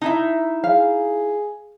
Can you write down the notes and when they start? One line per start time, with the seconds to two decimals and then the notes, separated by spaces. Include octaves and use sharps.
0.01 D#4 E4 E5
0.64 G#4 F5